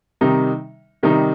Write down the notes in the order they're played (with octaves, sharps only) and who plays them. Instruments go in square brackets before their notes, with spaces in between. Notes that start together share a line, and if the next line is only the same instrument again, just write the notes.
[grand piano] C3 D#3 G3 D#4
C3 D#3 G3 D#4